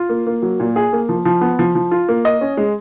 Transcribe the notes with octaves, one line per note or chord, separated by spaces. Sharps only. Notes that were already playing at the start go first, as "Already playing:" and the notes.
Already playing: F4
A#3
A#3
F#3
A#2
G#4
A#3
F3
F3
B3
F3
F3
F4
A#3
D#5
C#4
G#3